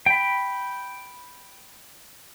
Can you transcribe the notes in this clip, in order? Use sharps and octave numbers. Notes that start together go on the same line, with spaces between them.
G5 B5